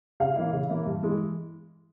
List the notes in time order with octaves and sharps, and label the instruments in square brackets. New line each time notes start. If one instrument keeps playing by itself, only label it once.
[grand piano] C#3 [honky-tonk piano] F5
[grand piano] E3 A#3 E4
C#3
E3 A#3 E4
G2
E3 G#3